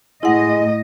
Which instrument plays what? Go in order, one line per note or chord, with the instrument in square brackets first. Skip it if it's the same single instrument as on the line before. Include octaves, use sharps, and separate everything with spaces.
[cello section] A2 D#5 [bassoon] G#3 [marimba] E4 F#5